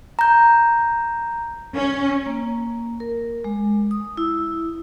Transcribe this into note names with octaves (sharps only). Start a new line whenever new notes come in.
A#5 G6
C#4
A#3
A#4
G#3
D#6
E4